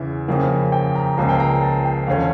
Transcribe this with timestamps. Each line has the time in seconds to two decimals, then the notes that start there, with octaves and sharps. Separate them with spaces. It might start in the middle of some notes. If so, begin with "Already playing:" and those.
Already playing: E2 C#3 E3 E5
0.28 F2 C#3 F3 A#3
0.72 G5
0.95 A#5
1.17 C#2 C#3 F3 A#3 A5
1.29 G5
1.40 A#5
1.63 A5
1.85 G5
2.07 E2 D3 A3 C#4 F5